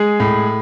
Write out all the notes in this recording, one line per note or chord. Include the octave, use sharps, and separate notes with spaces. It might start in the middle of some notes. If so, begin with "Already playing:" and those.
Already playing: G#3 G#4
A2